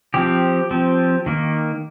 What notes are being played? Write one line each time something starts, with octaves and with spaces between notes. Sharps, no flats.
F3 C4 G4
F3 C4
D#3 A#3